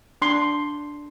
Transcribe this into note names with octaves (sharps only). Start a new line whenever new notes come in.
D4 C6